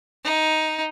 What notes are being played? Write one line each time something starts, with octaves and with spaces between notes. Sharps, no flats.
D#4